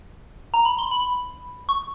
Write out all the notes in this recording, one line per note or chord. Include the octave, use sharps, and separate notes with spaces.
A#5
B5
C6
B5
C#6